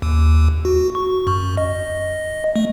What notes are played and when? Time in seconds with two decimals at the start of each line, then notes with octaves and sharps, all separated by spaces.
0.02 D#2
0.65 F#4
0.95 C#6
1.27 F#2
1.57 D#5
2.56 A3